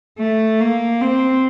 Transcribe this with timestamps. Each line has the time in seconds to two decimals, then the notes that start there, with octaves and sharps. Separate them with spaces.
0.18 A3
0.60 A#3
1.01 C4